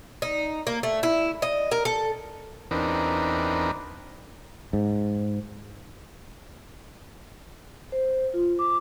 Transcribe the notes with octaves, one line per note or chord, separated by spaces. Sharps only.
D#4
A#3
A3
E4
D#5
A#4
A4
E2 C4 D4 D#4 A#4 B4
G#2
C5
F4
D6